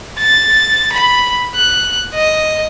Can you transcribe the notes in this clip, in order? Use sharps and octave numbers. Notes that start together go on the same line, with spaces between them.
A6
B5
F#6
D#5